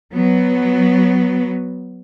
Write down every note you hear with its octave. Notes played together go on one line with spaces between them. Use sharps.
F#3 B3